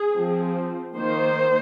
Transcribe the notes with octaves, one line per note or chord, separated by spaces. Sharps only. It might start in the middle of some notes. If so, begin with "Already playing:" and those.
Already playing: G#4
F3 C4
D#3 A#3 C5